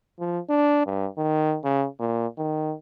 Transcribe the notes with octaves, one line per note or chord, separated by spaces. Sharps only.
F3
D4
G2
D#3
C#3
A#2
D#3